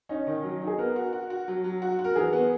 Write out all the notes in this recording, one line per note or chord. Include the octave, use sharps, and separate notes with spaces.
C#4 D#4
D#3
F#3
D#4
G#4
B3 A#4
F#4
F#4
F#4
F#3
F#3
F#4
F#4
A#4
E3 G#4
B3